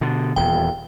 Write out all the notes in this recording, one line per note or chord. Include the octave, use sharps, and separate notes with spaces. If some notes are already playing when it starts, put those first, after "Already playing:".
B2 D3
D#1 E2 G5